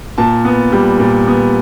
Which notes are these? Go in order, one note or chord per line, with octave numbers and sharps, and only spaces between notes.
A#2 A5
B3
G3
A#2
B3